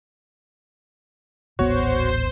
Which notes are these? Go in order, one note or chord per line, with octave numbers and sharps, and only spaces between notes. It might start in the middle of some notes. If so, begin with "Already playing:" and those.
D#1 A1 B3 F#4 C5 C#5